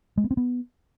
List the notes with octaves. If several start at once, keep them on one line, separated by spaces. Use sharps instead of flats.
G#3
B3
C4
B3